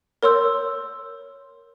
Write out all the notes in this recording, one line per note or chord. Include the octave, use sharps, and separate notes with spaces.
A#4 C#5 C6 E6 G6